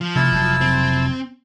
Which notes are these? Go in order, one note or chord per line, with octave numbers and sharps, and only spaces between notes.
F3
C3 A3 E4 A5 E6
F1 F#3
C4